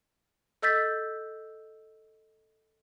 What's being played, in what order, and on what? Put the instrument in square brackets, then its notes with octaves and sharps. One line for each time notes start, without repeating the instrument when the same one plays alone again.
[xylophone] A4 D#5 E6 G6 A6 B6